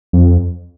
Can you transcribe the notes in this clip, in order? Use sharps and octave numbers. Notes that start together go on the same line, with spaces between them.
F2